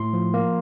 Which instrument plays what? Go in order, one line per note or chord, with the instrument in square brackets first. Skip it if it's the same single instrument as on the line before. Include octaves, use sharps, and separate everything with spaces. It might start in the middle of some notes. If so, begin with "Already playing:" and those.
Already playing: [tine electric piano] A2 C6
F3
A#3